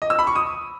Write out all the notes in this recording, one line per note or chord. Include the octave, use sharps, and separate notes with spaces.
D#5
E6
B5
C#6
D#6